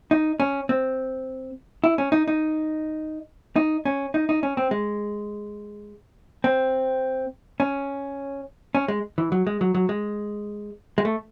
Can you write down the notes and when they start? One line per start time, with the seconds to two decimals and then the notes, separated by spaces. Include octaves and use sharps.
0.11 D#4
0.40 C#4
0.69 C4
1.84 E4
1.98 C#4
2.12 D#4
2.27 D#4
3.56 D#4
3.85 C#4
4.14 D#4
4.29 D#4
4.43 C#4
4.57 C4
4.71 G#3
6.44 C4
7.60 C#4
8.75 C#4
8.88 G#3
9.18 E3
9.32 F#3
9.47 G#3
9.61 F#3
9.75 F#3
9.89 G#3
10.98 G#3
11.05 A3